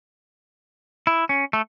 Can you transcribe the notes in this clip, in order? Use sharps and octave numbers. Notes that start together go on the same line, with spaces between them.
E4
C#4
A3